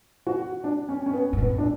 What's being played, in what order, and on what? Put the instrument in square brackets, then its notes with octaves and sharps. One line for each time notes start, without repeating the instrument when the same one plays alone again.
[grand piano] F#4
D4
C#4
C#4
B3
[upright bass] G#2
[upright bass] A2 [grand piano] B3
[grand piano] D4